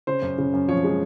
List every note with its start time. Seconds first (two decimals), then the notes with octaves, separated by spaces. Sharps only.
0.07 C#3 C5
0.22 F#2
0.38 C#3
0.53 F#2
0.68 F3 C#5
0.84 G#3